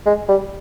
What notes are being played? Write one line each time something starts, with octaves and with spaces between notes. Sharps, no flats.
G#3
G3